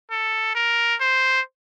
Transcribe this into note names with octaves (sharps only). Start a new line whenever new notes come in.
A4
A#4
C5